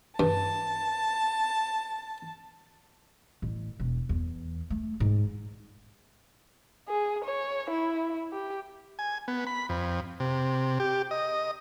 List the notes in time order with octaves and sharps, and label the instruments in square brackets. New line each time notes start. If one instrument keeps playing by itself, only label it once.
[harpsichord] G2 [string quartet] A5
[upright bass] A1
E1
E2
A3
G#2
[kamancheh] G#4
C#5
E4
G4
[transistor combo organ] G#5
B3
B5
F2
C3
G4
D#5